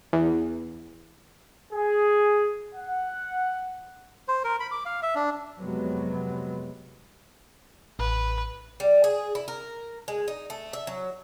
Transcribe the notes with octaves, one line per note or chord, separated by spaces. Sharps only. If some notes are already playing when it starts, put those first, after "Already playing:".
E2
G#4
F#5
C5
A#4
B5
D6
F5
E5
D4
F2 C3 F#3 G#3 B3
A1 B4
G3
G#4
E4
A#4
G#3
D#4
A3
E5
F#3